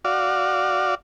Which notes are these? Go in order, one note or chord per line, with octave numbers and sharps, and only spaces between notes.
F#4 D5 F5